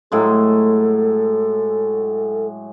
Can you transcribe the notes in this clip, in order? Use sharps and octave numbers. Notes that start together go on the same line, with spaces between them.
A2 F#3 G#3 A4